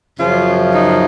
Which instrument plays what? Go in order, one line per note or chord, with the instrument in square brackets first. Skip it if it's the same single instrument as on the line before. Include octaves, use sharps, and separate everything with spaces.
[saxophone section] F#2 C#3 F3 F4
D#4